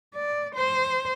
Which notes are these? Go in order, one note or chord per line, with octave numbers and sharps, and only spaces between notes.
D5
C5